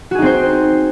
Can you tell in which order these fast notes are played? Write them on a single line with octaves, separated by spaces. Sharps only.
F#4 G#4 D#4 C4 C5